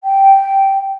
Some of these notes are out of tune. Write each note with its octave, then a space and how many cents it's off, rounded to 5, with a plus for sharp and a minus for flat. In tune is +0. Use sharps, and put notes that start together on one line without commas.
G5 -10